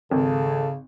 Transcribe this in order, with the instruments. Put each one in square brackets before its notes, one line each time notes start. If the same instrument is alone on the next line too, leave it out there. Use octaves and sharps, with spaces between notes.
[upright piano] G#1 [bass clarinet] C#3 [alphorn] A4